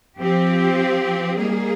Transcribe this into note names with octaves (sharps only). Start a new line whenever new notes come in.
F3 C4 G4
G3 A#3 D#4 G#4